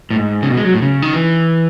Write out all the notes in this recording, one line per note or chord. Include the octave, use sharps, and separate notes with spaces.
A2
G#2
C#3
B2
G#3
F#3
A2
C#3
D#3
E3